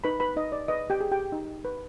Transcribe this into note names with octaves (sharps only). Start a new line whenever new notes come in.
D#4 B4 B5
B4 B5
D#4 D#5
D5
B4 D#5
G4 G5
G#4
G4 G5
D#4
B4